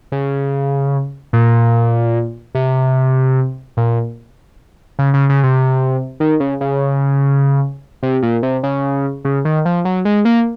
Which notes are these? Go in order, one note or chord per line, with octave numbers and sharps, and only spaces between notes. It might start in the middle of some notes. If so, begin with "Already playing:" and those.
C#3
A#2
C3
A#2
C#3
C#3
C#3
C3
D#3
C#3
C#3
C3
A#2
C3
C#3
C#3
D#3
F3
F#3
G#3
A#3